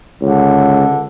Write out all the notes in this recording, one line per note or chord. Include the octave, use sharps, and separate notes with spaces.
C#2 D3